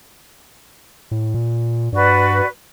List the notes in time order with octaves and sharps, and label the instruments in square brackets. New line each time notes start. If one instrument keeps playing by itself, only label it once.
[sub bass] A2
A#2
[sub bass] G2 [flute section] F#4 B4 D5